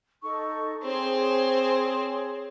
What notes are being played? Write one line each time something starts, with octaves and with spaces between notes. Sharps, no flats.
D#4 A4 C#6
C4 G#4 C5 C#5